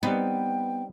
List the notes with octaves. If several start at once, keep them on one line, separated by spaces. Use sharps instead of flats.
G3 B3 C4 D#4 G5